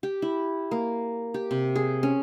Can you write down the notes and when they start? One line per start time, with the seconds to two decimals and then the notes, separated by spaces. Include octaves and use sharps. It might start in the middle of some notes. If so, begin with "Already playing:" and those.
0.03 G4
0.22 E4
0.71 A#3
1.34 G4
1.51 C3
1.76 G#4
2.03 C#4